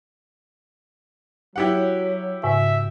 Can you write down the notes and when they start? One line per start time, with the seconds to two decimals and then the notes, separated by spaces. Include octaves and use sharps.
1.56 F#3 E4 G4 F#5
2.43 G#2 C#3 E5